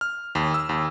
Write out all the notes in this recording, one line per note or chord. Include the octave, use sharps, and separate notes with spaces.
F6
D#2
E6
D#2